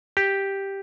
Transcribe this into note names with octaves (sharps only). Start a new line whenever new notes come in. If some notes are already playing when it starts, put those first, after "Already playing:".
G4